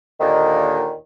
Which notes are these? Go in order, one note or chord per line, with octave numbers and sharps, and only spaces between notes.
D#2 A#2 D3 D#3